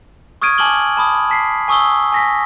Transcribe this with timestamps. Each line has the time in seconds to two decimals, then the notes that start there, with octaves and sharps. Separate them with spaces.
0.42 C#6 D#6 F6 G#6 D7 D#7
0.58 G#5 A5 D6 F6 F#7 G7
0.97 A5 B5 D#6
1.30 A5 B6 C7
1.68 G#5 C#6 D#6 E6 G7
2.12 G#5 A#6 B6